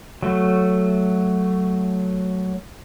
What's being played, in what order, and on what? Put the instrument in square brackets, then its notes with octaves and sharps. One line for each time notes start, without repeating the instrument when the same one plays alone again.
[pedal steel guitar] F#3 A3